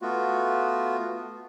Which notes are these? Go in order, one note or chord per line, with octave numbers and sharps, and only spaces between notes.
A3 B3 F4 F#4